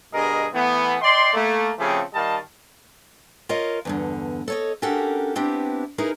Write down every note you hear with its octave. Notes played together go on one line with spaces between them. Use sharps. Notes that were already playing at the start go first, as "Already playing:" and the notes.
G2 B2 G#4 A#4 D#5
E3 A3 B3
D5 D#5 G5 C6
A3 A#3
C#3 F3 A3 C4 G4 G#4
D#3 G3 D#5 F5 A5
F4 A#4 C#5 D#5 F5
E2 G2 D3
A4 C#5 D#5
C#4 D4 F#4 G4 A4 A#4
B3 C4 D4 E4 G4
D#4 E4 G#4 A#4 B4